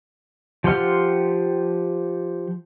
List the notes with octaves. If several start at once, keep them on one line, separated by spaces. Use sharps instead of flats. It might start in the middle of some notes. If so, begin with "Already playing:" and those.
F3 G4 F#5 C6 F6